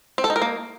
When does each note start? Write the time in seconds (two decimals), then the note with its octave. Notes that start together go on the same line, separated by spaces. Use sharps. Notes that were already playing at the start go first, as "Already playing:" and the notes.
0.18 C4
0.24 A4
0.30 D#4
0.36 A#4
0.42 A#3